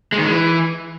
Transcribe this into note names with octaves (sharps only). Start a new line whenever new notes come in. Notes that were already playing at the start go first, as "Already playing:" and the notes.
G#3
D#3
G#3
E3